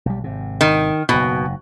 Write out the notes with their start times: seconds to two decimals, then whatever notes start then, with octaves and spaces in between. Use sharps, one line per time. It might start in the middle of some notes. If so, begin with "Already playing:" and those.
0.06 B1 G3
0.24 G#1 C3
0.61 D#3
1.09 F#1 G#2 B2